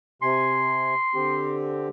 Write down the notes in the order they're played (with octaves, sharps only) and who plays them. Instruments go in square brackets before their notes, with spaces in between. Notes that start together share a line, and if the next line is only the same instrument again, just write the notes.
[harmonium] C3 G#5 [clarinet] C6
[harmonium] D3 C4 G4